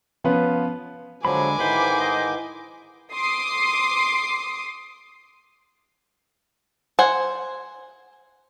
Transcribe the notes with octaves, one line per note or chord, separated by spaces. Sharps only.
F3 B3 C#4 F4 B4
D3 F3 F#3 G#3 G#5 B5 D6
G#2 D#3 E4 B4 C5 B5
C5 D#5
C6 D6 D#6 C7
C5 F#5 G#5